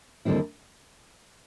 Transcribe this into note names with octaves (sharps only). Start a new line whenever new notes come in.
D#2 D3 G3 C4 E4